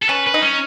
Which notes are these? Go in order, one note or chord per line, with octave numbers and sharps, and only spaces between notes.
A4
C#4 B4
B4
D#4
C#4